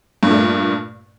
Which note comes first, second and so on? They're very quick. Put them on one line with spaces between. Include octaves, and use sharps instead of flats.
G2 A#2 A3